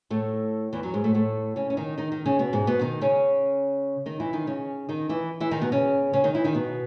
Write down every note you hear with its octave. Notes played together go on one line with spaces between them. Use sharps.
A2 A3
E2 E3
F#2 F#3
G#2 G#3
A2 A3
A2 A3
C#3 C#4
C#4
D#3 D#4
D#3 D#4
D#3 D#4
C#3 C#4
B2 B3
G#2 G#3
B2 B3
D#3 D#4
C#3 C#4
D#3 D#4
E3 E4
D#3 D#4
C#3 C#4
D#3 D#4
E3 E4
E3 E4
D#3 D#4
B2 B3
C#3 C#4
C#3 C#4
D#3 D#4
E3 E4
D#3 D#4
B2 B3